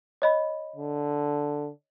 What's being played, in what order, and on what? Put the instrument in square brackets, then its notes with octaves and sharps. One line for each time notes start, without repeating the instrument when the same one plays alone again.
[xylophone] C#5 D#5 B5
[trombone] D3